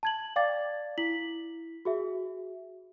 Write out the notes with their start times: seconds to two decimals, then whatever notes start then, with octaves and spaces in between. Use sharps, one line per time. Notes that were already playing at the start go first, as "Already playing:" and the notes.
0.03 A5 G#6 F#7
0.36 D5 F5 G5 D6 A6
0.98 E4 B6 F#7
1.85 F#4 G#4 E5